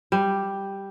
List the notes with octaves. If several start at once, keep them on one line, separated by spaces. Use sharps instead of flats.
G3